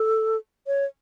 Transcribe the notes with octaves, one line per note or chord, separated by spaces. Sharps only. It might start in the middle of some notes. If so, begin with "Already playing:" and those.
Already playing: A4
C#5